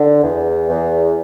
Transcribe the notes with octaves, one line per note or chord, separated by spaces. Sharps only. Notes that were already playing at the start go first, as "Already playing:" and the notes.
Already playing: D3
E2
E2